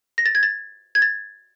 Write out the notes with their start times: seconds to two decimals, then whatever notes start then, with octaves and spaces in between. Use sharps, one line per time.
0.18 A#6
0.26 A6
0.35 G#6
0.43 A6
0.95 G#6
1.02 A6